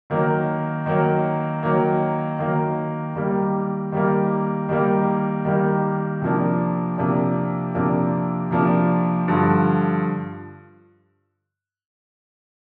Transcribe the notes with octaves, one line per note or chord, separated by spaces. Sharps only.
D#3 F#3 A#3
D#3 F#3 A#3
D#3 F#3 A#3
D#3 F#3 A#3
D#3 G3 A#3
D#3 G3 A#3
D#3 G3 A#3
D#3 G3 A#3
C3 F3 A#3 D4
C3 F3 A#3 D4
C3 F3 A#3 D4
C3 F3 A#3 D4
G2 D3 F3